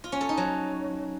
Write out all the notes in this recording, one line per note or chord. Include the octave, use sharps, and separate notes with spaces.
F4
C#4
A4
D#4
F#3